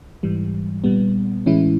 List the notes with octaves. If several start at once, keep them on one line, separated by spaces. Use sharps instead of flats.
G#2 E3 G3
A#2 G3 B3
A2 E3 G#3 C#4 E4